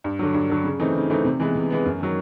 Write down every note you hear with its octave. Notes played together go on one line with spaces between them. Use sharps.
G2
D3 F#3
G2
D3 F#3
C#3
E3 A3 C4 D#4
C#3
E3 A3 C4 D#4
C3
E3 G#3 B3
C3
E3 G#3 B3
F#2
D#3 F#3